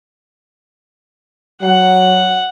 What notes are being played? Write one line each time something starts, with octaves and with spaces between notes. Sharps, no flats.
F#3 F#5